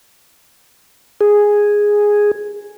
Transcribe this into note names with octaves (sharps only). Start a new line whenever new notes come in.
G#4